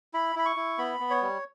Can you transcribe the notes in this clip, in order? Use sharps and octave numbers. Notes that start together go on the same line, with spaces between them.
E4 B5
E4 B5
C#6
E4
B3 B5
B3
C#5
G3